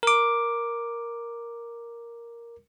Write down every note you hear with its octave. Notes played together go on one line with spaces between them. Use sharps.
A#4 D6